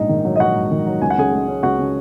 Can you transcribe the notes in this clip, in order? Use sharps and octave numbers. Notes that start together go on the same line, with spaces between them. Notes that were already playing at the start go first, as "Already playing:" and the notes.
Already playing: A#1 G#2 D#4 D#5
D#3
F#3
D#5
A#1 F#4 F#5
G#2
D#3
F#3
C#2 G#5
F#5
C#3 G#4 G#5
G#3
C#4
C#2 F#4 F#5
C#3